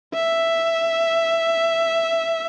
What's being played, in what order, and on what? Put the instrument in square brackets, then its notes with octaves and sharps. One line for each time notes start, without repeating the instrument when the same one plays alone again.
[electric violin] E5